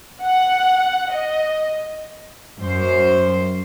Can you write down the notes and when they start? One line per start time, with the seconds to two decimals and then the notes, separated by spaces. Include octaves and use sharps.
0.23 F#5
1.12 D#5
2.60 F#2 C5